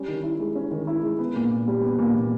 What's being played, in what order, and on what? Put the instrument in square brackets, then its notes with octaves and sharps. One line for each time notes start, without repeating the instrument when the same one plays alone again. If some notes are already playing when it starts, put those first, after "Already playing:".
Already playing: [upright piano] G3 C#4
D#3
E4
G#3
C#4
D#3
E4
G#3
B3
A#2
A#2
G3
B3
A#2
A#2